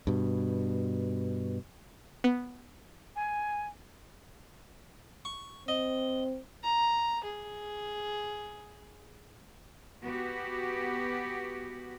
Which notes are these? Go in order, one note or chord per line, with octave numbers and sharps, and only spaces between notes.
G2 B2
B3
G#5
C#6
C4 D#5
A#5
G#4
B3 F#4 G4